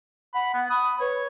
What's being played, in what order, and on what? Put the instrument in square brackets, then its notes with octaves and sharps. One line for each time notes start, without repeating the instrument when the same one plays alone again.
[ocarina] F#5 [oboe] B5
[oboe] B3
[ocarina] B5 [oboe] D#6
[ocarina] B4 [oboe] C#5